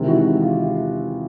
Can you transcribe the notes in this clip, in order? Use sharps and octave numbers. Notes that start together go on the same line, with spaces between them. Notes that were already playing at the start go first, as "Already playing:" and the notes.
Already playing: E2 C3 D#3 G#3 C4
E4 F#4
F4 G4